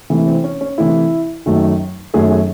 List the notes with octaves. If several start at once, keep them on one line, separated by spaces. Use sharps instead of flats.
C3 E3 A3
C4
C#4
C#4
C3 E3 A3 E4
F#2 D#3 F#3 A3
F#2 D#3 F#3 A3 G#4
G#4